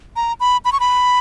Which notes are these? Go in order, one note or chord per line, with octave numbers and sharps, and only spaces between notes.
A#5
B5
B5
C#6
B5